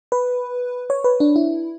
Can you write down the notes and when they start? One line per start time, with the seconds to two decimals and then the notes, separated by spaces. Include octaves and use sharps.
0.12 B4
0.90 C#5
1.04 B4
1.20 D4
1.36 E4